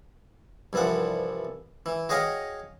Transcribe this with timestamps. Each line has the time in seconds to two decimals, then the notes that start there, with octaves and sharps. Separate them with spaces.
0.73 C2 G2 E3 F3 F#5
1.86 E3
2.09 F#4 G#4 C#5 D#5 F5 G5